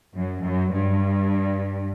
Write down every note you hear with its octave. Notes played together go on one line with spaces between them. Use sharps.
F#2
F#2
G2